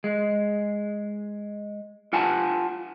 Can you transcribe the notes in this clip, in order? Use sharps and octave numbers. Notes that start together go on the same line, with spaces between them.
G#3
F4 F#5 G#5 A5